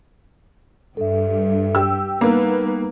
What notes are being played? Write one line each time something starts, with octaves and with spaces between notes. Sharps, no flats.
G2 A4 E5
G4 E6
G3 A#3 B3 D#4 B4